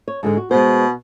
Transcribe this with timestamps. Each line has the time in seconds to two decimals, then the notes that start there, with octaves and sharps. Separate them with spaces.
0.08 C#5
0.23 G#2 D3 G#3
0.37 F#4
0.51 B2 G#3 B3 C5